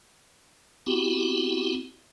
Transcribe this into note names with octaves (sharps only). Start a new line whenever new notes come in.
B3 C4 E4 F#4 G4